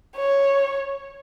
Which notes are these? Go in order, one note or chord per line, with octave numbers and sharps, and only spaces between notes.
C#5